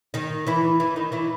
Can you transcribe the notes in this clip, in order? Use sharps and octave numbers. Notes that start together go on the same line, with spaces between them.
D#3 D#4
E3 E4
E3 E4
D#3 D#4
E3 E4